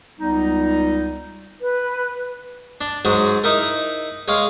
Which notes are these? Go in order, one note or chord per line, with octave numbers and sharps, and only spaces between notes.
C#2 G3 B3 D#4
B4
D4
G#2 F#3 G#3
D#4 E4 A#4
G#3 C#5 F5